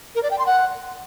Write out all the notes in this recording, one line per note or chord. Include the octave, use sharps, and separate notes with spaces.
A#4
D5
G5
C6
F#5